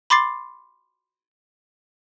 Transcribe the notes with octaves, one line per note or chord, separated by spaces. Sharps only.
B5 C6 D6 A6 C7